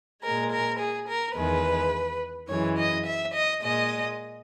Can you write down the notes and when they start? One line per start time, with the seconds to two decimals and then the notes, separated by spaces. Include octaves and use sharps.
0.22 A#2 G#3 A#4
0.51 A#4
0.79 G#4
1.08 A#4
1.36 E2 D#3 G#3 B4
2.48 F#2 E3 G#3 C#5
2.77 D#5
3.05 E5
3.33 D#5
3.61 A#2 G#3 D#5